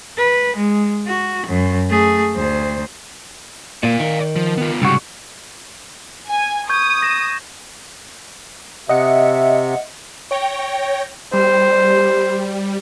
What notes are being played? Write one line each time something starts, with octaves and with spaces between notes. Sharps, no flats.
B4
G#3
F#4
F#2
A3 G#4
D2 C5
A#2 D5 F5
D#3
F3
B3 F4
C2 G#2 C#3 G3 F#4
G#5
C#6 D#6 G6 G#6
A#6 E7
C3 D#5 E5 F#5 C#7
C#5 G5 A#6
G3 C5